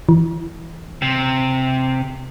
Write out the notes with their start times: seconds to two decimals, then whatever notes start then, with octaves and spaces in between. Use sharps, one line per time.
0.09 E3
1.02 C3